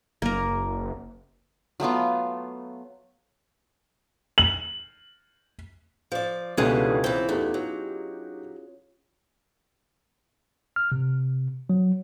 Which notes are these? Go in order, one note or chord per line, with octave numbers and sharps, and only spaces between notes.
F#1 A#3 A#4
F#3 A3 B3 F4
F#7
F3 D5
C#2 B2 D3 E3 G3 C#4 F4 G#4
E3 C4
E2 A3 D#4 G4
F#3
F6
C3
F#3